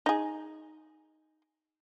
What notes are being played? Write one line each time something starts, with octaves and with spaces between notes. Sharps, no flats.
D#4 G#4